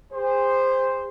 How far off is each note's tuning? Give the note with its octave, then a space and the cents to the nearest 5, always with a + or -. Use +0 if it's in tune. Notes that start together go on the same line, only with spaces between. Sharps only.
G#4 -45 C5 +0